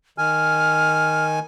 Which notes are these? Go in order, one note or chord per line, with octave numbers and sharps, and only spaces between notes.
D#3 G#5 F6